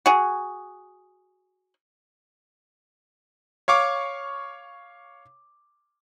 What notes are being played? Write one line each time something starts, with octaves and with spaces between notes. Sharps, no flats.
F#4 G#4
C#5 F5 C#6 D6